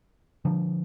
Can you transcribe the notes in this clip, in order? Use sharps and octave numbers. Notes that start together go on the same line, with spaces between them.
D3 F3